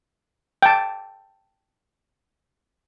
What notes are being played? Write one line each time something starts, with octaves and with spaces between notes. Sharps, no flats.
G5 A5